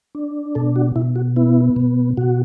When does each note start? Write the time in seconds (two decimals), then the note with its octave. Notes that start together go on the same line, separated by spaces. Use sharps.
0.15 D4
0.55 B2 A4
0.76 F#4
0.96 B2 E4
1.16 F#4
1.36 B3 E4
1.76 B2
2.17 B2 F#4